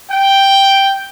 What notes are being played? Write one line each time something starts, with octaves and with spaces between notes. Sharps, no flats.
G5